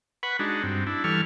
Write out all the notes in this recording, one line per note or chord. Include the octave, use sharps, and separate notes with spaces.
B4 F#5 B5 C#6
G#3 D4 D#4 F#4
G2 C4
D4 E4
E3 G3 A4 C#6 F6